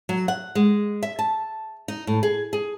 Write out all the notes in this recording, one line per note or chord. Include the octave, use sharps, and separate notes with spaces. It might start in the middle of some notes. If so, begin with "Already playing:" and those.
F#3
F#5
G#3
E5
A5
D#4
A2
G#4
G#4